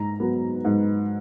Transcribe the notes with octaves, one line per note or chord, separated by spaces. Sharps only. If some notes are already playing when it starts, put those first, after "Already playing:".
Already playing: G#2 A#5
F#3 B3
G#2